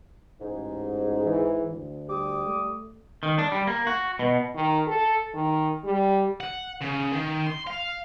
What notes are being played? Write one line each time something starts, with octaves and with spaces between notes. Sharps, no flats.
A1 G#2
E3
D2
G3 D6 D#6
A3
D#3
D4
G3
A#3
F#4
B2
D#3
A4
D#3
G3
F#5
C#3
D#3
C6
F5